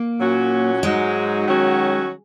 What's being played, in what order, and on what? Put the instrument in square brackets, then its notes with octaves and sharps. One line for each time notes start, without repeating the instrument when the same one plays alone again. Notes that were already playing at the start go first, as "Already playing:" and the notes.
Already playing: [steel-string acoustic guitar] A#3
[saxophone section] A#2 F#3 C#4 F#4
[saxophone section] G#2 F#3 D#4 F#4 [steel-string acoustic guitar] G#3
[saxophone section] D#3 F#3 C#4 F#4